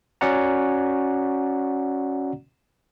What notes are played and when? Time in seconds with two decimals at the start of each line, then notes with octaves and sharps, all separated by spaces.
0.21 C#4 F#4 D5 F#5 A#5